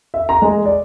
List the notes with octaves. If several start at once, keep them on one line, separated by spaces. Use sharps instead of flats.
E5
A#5
G#3
D5